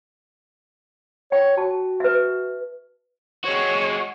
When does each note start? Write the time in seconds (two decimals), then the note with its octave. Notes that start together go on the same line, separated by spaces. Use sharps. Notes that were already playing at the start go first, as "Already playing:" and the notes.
1.32 C#5 G5
1.58 F#4 A5
2.00 B4 E5
3.44 G#3 F#4 C#5